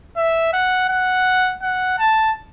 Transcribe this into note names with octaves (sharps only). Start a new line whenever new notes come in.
E5
F#5
F#5
F#5
A5